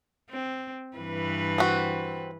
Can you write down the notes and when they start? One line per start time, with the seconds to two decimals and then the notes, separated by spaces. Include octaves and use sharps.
0.30 C4
0.97 G2 E3 B4
1.58 C4 F#4